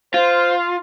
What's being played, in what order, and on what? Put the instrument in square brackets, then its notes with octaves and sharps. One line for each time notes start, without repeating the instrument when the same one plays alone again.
[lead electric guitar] F4 [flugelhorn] C5